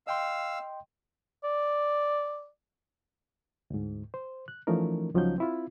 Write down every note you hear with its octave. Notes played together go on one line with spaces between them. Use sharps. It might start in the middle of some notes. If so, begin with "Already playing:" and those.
D#5 F5 G5 C6 E6
D5
D2 G#2
C5
F#6
E3 F3 A3 C#4 D#4 A#4
C#2 F3 F#3 C#4 D#4 G6
C4 E4 F4